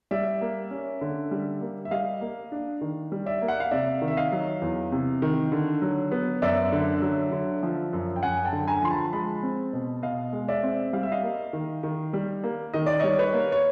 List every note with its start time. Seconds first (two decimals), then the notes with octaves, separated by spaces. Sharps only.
0.11 G3 D5 E5
0.41 A#3
0.70 C#4
1.01 D3
1.31 G3
1.61 A#3
1.85 E5
1.91 G3 D#5 F5
2.21 A#3
2.52 D4
2.81 D#3
3.12 G3
3.26 D5 E5
3.42 A#3
3.48 F#5
3.60 F5
3.71 C3 D5 E5
4.02 D#3
4.08 E5
4.17 D#5 F5
4.32 F#3
4.62 E2
4.92 C3
5.22 D#3
5.52 D3
5.82 F#3
6.12 B3
6.42 F#2 D5 E5
6.72 D3
7.02 F#3
7.32 D3
7.63 F3
7.93 F#2
8.16 G5
8.23 F#2 F#5 G#5
8.45 G5 A5
8.53 D3
8.68 G#5 A#5
8.82 F3 C6
8.90 A5 B5
9.13 G#3 A5 B5
9.43 C4
9.73 B2
10.03 B2 D#5 F5
10.33 G#3
10.48 D5 E5
10.63 C4
10.93 G3 F5
11.03 E5
11.12 D#5 F5
11.23 A#3
11.53 D#3
11.83 D#3
12.13 G3
12.44 A#3
12.74 D#3 D#5
12.86 D5
13.00 G3 C#5 D#5
13.19 B4 C#5
13.33 A#3
13.52 C#5